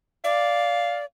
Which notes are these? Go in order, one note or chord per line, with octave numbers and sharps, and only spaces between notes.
D5 F5